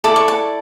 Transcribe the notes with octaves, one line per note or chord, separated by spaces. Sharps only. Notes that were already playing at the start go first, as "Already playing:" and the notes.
E4 A4 D5 D6
C#6
A5